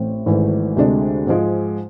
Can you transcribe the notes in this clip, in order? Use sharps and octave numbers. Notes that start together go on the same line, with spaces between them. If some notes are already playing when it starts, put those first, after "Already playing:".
Already playing: A1 A2 C4
G#1 G#2 E3 A3 E4
D2 C3 G#3 D4
G#2 F3 G#3